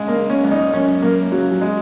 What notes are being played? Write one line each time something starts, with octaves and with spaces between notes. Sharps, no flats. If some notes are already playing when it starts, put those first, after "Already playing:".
Already playing: C#3 G#3
A#3
C#3
C#4
C#2
D#4
F#2 C#4
F#2 A#3
C#3 F#3
F#3
G#3